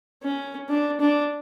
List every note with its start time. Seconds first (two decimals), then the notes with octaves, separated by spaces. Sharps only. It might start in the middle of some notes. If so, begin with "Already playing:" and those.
0.23 C#4
0.69 D4
1.00 D4